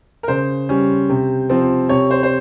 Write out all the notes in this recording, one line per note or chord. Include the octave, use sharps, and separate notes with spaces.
A#4
C#3 C5
G3 C#4
C3
F3 C4
C3 C#5
C5
C5